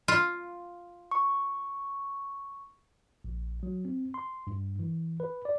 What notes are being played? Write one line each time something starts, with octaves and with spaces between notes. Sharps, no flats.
F4
C#6
A#1
F#3
C4
C6
G2
E3
B4
D5